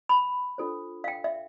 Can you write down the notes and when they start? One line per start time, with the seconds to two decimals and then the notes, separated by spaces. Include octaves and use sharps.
0.09 B5
0.58 D4 F4 A4 C5
1.04 F5
1.08 G5
1.24 E5